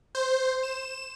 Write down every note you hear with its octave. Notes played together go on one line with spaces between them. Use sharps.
C5
E7